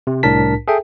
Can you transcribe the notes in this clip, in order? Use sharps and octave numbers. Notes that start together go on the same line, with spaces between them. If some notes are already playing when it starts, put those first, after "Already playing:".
C3
C2 A2 D4 A#4 A5 B6
G#4 A4 E5 G5